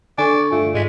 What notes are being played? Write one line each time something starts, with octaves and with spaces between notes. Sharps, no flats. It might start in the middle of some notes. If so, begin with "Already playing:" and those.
D3 D4 A4 D5 G#5 C#6
G2 A3 F4
G#2 G#3 B6